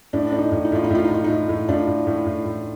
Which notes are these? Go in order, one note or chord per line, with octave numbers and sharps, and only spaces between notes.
A2 D4
A2 D4
D#4
A2
D#4
A2 F4
D#4
A2 F4
D#4
A2 F4
A2 D#4
A2
A2 D4 F4
A2
A2
A2
A2